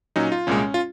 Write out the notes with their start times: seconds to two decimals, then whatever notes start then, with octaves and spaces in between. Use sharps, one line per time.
0.16 A#2 F#3 C#4 D#4
0.32 F4
0.47 C2 A#2 G#3 C#4
0.74 F4